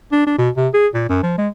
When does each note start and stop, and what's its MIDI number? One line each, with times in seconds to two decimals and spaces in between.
0.12 0.22 62
0.27 0.38 62
0.38 0.49 47
0.57 0.68 48
0.74 0.87 68
0.94 1.07 46
1.09 1.21 42
1.23 1.36 53
1.38 1.48 56